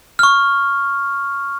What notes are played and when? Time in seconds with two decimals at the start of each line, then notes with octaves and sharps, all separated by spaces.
0.19 C#6 F6